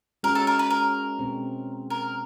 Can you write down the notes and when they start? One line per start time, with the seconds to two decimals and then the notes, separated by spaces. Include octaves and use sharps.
0.23 G#3 C#4 F#4 A#4
0.35 A4
0.47 A#4
0.59 B4
0.70 A#4
1.19 B2 G#3 C4
1.90 A#4